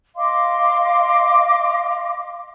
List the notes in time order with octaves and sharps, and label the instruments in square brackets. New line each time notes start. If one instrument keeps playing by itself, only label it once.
[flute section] D#5 F5 C6 D6